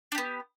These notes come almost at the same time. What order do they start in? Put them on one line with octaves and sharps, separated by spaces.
D4 G4 B3